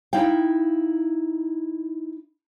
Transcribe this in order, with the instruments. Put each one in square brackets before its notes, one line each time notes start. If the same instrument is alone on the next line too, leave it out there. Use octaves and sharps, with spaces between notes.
[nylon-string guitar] D#4 E4 D5 F5 G5